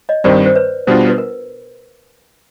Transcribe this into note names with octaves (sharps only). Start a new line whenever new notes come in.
C#5 D#5
G2 D#3 G3 C4 C5 D5
C5
B4 C#5
B2 G3 B3 D4 F4 C5
B4
A#4